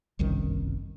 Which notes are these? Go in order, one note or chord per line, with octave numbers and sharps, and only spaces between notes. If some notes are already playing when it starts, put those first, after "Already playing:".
G1 C2 F#2 D#3